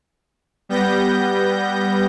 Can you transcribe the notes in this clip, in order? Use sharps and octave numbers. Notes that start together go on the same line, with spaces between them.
G3 B3 G6 A#6